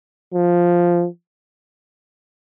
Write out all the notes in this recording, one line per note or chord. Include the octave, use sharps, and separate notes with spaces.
F3